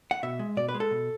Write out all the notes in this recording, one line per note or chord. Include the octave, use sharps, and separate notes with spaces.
F#5
B2 E5
G#3
B2 D5
B4
G#3
A4
B2